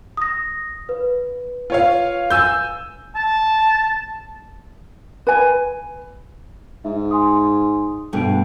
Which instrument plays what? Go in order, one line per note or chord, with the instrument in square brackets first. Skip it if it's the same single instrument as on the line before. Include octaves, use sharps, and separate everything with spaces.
[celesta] D#6 A#6
B4
[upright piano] F4 C#5 F5
G#5 E6 G6
[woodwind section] A5
[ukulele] B4 G#5
[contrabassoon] G#2 [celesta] E5
[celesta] G#5 C6 D#6
[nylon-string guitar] G2 B2 A3 [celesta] G#4 D7